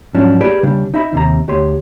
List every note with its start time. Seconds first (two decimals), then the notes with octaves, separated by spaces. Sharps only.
0.15 G#2 F3 F#3 C#4 D4
0.41 G4 G#4 B4 D5
0.63 C#3 G3 D4
0.94 D#4 D#5 E5 B5
1.13 D#2 C3 A#5
1.48 D2 G4 C#5 C6